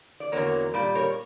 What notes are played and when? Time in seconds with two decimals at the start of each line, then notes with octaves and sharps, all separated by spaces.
0.20 D5
0.32 E2 D3 F#3 A#3 A#4 C#5
0.74 A#2 G3 D5
0.95 A#4 C#5